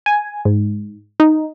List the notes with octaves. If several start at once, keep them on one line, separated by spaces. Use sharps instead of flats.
G#5
G#2
D#4